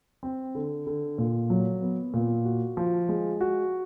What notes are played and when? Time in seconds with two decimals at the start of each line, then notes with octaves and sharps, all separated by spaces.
0.23 C4
0.55 D3
0.87 D3
1.18 A#2
1.50 F#3
1.82 B3
2.14 A#2
2.45 F#4
2.77 F3
3.09 G#3
3.41 F#4